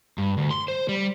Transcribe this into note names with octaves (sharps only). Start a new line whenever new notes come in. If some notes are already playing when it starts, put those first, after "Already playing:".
G2
D2
C6
C5
G3